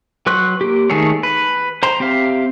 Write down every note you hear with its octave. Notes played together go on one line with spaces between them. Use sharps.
F#3 B4 C6 C#6 F#6
A#3 G4
D#3 A3 G#4 A4 C#5
B4
C5 A#5 C6
C4 G4 E5 F5